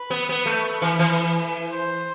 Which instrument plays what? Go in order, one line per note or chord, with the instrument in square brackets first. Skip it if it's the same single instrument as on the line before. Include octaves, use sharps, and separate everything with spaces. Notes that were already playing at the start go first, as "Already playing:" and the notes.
Already playing: [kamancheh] B4
[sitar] B3
B3
A3
E3
E3
[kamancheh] C5